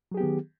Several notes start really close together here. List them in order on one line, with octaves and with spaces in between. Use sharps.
F#3 G#4 G4 B3 D#3